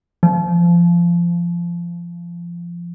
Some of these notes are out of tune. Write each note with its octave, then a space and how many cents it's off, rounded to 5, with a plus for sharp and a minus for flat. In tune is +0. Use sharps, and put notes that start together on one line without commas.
F3 -20